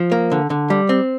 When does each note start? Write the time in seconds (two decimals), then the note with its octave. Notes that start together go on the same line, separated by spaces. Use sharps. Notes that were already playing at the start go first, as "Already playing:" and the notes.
Already playing: F3
0.12 A#3
0.32 D3
0.50 D3
0.70 G3
0.89 C4